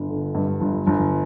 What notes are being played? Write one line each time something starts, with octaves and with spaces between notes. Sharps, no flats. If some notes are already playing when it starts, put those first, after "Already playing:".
Already playing: G1
D3
G2
G1
G1